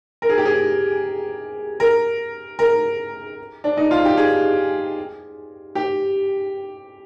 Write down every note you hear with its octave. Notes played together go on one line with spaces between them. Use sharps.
A#4
G#4
G4
G#4
A#4
A#4
D4
D#4
F4
G4
G#4
G4